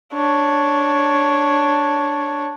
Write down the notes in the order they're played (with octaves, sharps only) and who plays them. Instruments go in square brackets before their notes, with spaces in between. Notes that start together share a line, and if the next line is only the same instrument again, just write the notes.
[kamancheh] D4 C#5